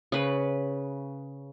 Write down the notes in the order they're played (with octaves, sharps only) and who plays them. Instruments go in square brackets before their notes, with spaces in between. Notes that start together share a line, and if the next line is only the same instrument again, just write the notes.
[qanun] C#3 B4